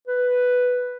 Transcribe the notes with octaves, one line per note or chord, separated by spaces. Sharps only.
B4